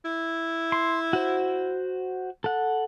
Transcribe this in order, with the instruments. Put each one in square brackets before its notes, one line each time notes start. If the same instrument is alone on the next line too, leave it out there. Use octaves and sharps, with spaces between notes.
[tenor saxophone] E4
[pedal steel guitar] C6
F#4 C5
A4 F#5